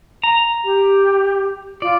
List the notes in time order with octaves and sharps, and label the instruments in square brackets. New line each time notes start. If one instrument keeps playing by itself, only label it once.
[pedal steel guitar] A#5
[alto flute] G4
[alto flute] F4 [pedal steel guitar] D5